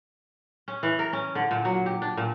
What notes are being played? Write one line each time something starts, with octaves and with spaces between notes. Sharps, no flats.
C#4
E3
A#4
C#4
D3
A#2
F#3
G4
D4
A#2